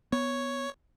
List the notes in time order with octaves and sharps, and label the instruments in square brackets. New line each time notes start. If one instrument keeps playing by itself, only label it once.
[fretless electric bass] B3 [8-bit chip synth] C#5